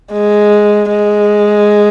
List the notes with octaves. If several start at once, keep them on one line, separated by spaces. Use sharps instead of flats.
G#3
G#3